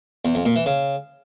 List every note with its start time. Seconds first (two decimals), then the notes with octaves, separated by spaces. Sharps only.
0.25 E2
0.35 F2
0.45 A#2
0.56 E3
0.66 C#3